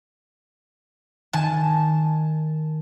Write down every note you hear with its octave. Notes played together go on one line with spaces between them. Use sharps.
D#3 G#5 A5